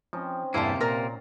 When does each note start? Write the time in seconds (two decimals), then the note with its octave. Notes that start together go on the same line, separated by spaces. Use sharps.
0.13 F3 C4 C#4 D#4
0.54 E2 G2 C3 A#3 E4 C5 G#5 A5
0.81 A#2 A#4 D5 A#5